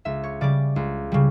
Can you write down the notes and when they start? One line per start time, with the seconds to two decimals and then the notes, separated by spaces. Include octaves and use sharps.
0.05 C#2 E5
0.24 C#5
0.41 C#3 G3 D5
0.76 C#2
1.12 C#3 G3